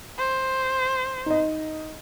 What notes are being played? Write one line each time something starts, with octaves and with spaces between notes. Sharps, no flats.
C5
D#4 D#5